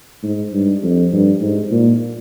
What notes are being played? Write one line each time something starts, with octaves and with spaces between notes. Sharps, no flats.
G#2
G2
F2
G2
G#2
A#2